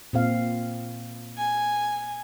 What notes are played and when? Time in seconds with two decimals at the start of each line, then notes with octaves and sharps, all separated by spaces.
0.13 A#2 C4 F5
1.38 G#5